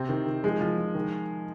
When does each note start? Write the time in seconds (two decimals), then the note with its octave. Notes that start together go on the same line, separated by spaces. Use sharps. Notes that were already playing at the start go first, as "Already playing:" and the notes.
Already playing: C3 C4
0.09 D#3
0.27 D#3
0.44 F3 G#3
0.61 F3
0.78 F3
0.95 D#3